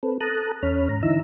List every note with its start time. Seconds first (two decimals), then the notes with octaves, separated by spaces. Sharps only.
0.03 C4 A4 B4
0.21 A4 A5 A#5 D#6 F#6
0.63 E2 C#4 C#5 B5 F6
0.89 G#2 A#5
1.03 D3 E3 D#4 E4 A#5 E6